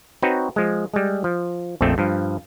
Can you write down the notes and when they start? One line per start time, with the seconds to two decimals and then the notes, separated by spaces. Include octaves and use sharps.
0.22 C4 D#4 F#4 B4 C#5
0.56 F3 G#3
0.94 G3 G#3
1.24 F3
1.81 A#1 F2 A3 C4 A4
1.98 G2 F3